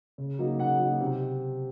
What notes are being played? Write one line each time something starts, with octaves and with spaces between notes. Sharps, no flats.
C#3
F#3 A#3 D#4
C#3 F#5
F#3 A#3 D#4
C3